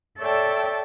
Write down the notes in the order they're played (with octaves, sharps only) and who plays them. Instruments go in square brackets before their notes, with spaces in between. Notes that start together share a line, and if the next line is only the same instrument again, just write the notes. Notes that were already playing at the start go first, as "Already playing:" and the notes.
[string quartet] A4 C#5 D5 E5 G5 A5